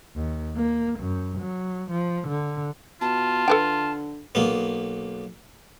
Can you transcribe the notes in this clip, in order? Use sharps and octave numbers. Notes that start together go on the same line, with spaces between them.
D#2
A#3
F#2
F#3
F3
D3
B2 F4 A5
D3 A4 B4 G5
B1 A#3 B3